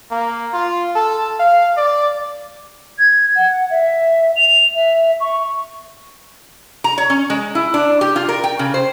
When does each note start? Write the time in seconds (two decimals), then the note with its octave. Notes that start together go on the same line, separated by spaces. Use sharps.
0.11 A#3
0.53 F4
0.95 A4
1.39 F5
1.77 D5
2.99 G#6
3.36 F#5
3.70 E5
4.36 F7
4.75 E5
5.20 C#6
6.84 A#5
6.98 C#5
7.10 C#4
7.30 G#3
7.55 E4
7.74 D4
8.01 G4
8.16 F4
8.29 A#4
8.44 G5
8.59 C#3
8.74 C5